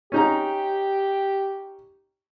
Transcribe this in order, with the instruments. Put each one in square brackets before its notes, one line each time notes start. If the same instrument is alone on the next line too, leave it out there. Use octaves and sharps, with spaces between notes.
[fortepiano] C#4 D#4 A#5 [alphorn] G4